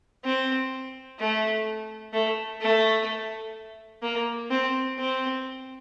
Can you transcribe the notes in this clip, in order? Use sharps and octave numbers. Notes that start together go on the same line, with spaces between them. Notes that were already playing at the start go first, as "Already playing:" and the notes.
C4
A3
A3
A3
A#3
C4
C4